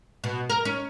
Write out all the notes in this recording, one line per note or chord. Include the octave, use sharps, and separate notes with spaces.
B2
A#4
C#4